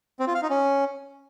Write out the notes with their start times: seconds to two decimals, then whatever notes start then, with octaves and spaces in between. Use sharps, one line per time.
0.19 C4
0.27 F4
0.35 F5
0.42 D#4
0.50 C#4